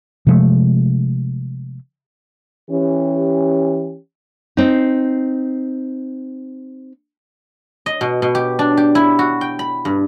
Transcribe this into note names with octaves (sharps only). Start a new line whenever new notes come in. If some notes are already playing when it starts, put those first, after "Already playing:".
C3 F3 G#3 A3
E3 C#4 G4
C4 D#4
D#5
B2
B2
G4
D4
G4
E4
F#4
G5
B5
G2